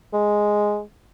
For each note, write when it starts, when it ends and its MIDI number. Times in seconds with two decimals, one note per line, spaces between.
0.13 0.82 56